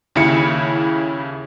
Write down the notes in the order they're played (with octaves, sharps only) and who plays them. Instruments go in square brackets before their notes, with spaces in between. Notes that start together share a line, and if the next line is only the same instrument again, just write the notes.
[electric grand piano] D#2 C#3 E4 C#7